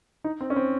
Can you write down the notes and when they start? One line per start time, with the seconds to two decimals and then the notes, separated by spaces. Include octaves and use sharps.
0.24 D#4
0.41 C4
0.50 C#4
0.56 C4